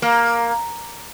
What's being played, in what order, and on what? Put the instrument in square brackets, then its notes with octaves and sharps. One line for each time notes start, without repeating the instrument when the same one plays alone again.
[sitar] A#3